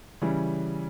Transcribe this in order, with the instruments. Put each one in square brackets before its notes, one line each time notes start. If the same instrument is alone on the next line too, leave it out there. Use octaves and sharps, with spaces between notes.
[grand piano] C#3 E3 G3 C#4